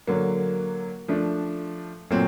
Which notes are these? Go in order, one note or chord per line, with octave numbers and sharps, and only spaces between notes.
D3 F#3 A#3
F3 A3 D4
A#2 F#3 A3 C4